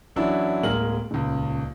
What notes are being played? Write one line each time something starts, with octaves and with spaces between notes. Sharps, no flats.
F#2 E3 F#3 D4 E4
D1 G#3 A#3 A#4 F#7
D#1 C#2